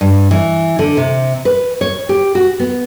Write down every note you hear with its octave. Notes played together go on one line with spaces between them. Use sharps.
G2
E3
D3
C3
B4
C#5
G4
F#4
B3